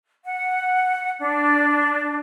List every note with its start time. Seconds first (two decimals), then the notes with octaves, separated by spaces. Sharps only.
0.23 F#5
1.19 D4